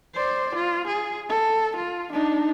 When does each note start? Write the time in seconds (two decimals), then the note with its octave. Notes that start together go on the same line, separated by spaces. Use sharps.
0.15 C5 D5
0.55 F4
0.88 G#4
1.30 A4
1.77 F4
2.13 D4 D#4